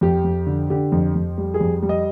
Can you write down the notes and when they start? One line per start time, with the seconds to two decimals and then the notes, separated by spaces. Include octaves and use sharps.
0.01 F2 G4
0.24 F2
0.47 D3
0.70 D3 G4
0.92 F2
1.15 F2
1.38 G3
1.54 G#4
1.60 F2
1.82 G3
1.89 D#5